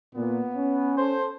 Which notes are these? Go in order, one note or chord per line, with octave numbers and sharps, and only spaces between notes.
A#2 B3
C#4
A4 C5